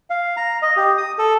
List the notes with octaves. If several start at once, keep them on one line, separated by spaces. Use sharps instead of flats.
F5
A#5
D#5
G4
D#6
A4